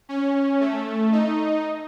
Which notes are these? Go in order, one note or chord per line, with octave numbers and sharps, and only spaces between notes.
C#4
A3
D#4